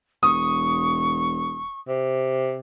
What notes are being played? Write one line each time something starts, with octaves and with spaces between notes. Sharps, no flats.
E1 C#6 D#6
C3